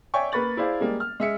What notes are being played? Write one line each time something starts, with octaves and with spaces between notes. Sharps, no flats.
C#5 D5 E5 G5 G#5 C#6
A#3 B4 B5 C#6 A6 F#7
E4 G#4 C5 D5 F5
G3 G#3 A#3
F6
G#3 E5 C#7